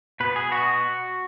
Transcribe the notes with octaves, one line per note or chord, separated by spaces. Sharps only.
B2 B3 B4
G#4
B2 B3 F#4